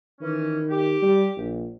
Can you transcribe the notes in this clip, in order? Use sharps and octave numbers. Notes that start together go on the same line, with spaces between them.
D#3 E3 C#4
G4
G3
A#1